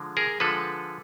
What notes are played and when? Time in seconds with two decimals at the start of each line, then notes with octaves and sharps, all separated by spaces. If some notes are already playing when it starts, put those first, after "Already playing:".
Already playing: D3 F3 G#3
0.17 G#4 A#4
0.40 D3 F3 G#3 A4 B4